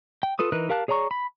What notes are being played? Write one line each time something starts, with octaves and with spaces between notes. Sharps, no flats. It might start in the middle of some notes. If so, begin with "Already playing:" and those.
G5
F4 A4 B4 D#6
E3 D#4 A#4 B4 F#6
G4 A#4 F5 A5 F#6
G#4 C#5 D5 A#5 C#6
B5